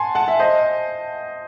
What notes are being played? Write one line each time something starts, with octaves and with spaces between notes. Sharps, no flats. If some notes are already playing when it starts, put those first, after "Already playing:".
Already playing: F#5 G#5 A5 C6
F#5 A5
E5
C5 D#5